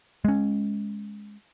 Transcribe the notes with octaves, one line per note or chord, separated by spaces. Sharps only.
G#3 C#4